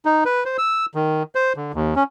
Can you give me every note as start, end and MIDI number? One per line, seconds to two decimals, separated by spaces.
0.05 0.24 63
0.25 0.44 71
0.45 0.57 72
0.58 0.86 88
0.95 1.23 51
1.35 1.53 72
1.57 1.72 50
1.74 1.94 39
1.96 2.03 61